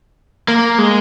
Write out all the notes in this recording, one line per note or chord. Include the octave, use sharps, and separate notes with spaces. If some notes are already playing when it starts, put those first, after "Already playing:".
A#3
G#3